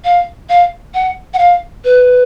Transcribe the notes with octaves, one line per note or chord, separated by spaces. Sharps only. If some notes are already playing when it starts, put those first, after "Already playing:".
F5
F5
F#5
F#5
F5
B4